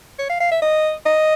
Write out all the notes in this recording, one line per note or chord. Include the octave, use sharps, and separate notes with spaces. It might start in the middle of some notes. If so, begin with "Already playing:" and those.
C#5
F5
F5
E5
D#5
D#5